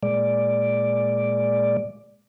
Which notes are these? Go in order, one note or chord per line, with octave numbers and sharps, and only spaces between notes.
A#2 G#3 D5